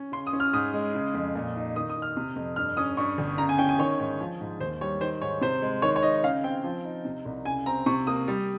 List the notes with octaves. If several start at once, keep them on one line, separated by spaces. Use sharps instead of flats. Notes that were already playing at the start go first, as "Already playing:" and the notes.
Already playing: C#4
C#3 C6
D#6
C#4
F6
G#2 D#6
G#3
C#3
F2
A#2
D#4
D#3 D#6
D#6
D#4
F6
C3
F2
G2 F6
C#4 D#6
G2 C#6
G1
C#3 A#5
G#5
C#4 G5
G#5
D#3 C#5
G#2
F3
G#2
D#2 C5
G3 C#5
D#3 C5
G#2 C#5
C3 C5
G#3
D#3 C#5
C#5
D#4 D#5
C#3 F5
C4 G5
F3
D#4
C3
C2
C#3 G#5
C4 A#5
C3 C#6
A#3 D#6
G3